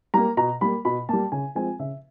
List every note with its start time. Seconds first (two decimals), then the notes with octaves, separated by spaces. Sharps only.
0.14 G3 A#3 A#5
0.37 B2 A#5
0.61 G3 A#3 B5
0.85 B2 B5
1.09 G3 A#3 A5
1.32 C#3 G#5
1.55 F3 G#3 C4 G#5
1.79 C#3 E5